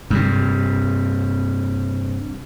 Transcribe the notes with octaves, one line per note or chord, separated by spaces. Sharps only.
G2 C3